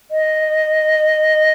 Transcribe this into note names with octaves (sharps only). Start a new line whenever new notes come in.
D#5